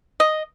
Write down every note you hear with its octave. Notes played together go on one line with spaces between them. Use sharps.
D#5